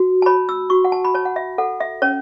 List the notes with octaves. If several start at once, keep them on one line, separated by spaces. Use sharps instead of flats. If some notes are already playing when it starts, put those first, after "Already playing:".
Already playing: F#4
A5
C#5 B5
E6
F#4 C#6
F#5
A5
B5
C#5 A5
F#5
E5
A4 F#5
E5
C#4 C#5